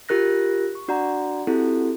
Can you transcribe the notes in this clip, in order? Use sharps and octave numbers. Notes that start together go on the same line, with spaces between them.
F4 G4 A#4 F#6 A#6
C#6
D4 F#4 D5 F#5 A#5
C4 E4 F#4 G4 A4